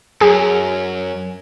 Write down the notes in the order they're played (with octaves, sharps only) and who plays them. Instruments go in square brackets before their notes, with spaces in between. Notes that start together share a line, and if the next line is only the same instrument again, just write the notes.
[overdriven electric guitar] F#2 [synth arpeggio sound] G#4